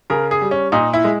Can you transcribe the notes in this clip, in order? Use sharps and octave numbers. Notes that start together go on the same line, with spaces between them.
C#3 A#4
G#4
G3
C#4
A#2 D#4
E4
G#3